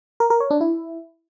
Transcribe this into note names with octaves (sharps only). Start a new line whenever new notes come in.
A#4
A#4
C#5
D4
E4